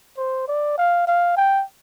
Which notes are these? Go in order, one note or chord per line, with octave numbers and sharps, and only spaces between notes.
C5
D5
F5
F5
G5